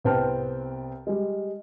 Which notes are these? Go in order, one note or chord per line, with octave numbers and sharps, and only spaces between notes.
C2 B3 C4 G5 A5 F6
G3 G#3